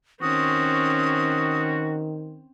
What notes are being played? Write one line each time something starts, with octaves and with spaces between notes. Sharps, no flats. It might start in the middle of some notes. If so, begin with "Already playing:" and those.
D#3 C4 C#4 F#4 D#6